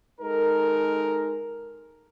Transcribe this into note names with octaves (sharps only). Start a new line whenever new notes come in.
G#3 D#4 A4 A#4